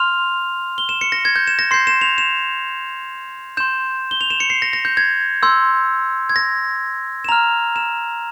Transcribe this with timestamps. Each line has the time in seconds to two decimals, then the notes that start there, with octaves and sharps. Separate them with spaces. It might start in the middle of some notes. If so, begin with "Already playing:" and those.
Already playing: C6 F6 F7
0.78 G7
0.89 E7
1.01 C#7
1.12 A#6
1.25 G#6
1.36 G6
1.47 E7
1.59 A#6
1.71 C6 G6 C7
1.87 E7
2.01 F7
2.18 E7
3.57 C6 G6 E7
4.11 G7
4.21 F7
4.30 E7
4.40 C#7
4.50 C7
4.62 A#6
4.73 A#6
4.85 G6
4.97 G#6
5.43 C6 E6 G6
6.29 G#6
6.36 A#6
7.24 E7
7.29 A#5 F6 F7
7.76 E7